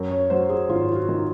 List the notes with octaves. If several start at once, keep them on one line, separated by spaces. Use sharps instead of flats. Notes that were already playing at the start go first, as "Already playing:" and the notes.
Already playing: F#2 A#4
C#5
F#3 C5
G#4
G#1 F4
F4
F#4
D#3